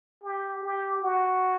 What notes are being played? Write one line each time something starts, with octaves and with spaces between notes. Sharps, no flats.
G4
G4
F#4